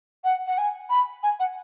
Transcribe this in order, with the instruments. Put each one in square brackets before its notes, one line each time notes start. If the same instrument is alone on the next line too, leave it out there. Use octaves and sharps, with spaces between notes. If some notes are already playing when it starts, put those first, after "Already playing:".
[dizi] F#5
F#5
G#5
B5
G#5
F#5